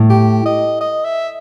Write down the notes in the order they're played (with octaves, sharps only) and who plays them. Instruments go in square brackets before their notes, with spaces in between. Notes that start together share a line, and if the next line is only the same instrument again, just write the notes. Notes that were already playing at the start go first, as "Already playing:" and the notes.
Already playing: [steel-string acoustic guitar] A2
[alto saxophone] G4
D#5
D#5
E5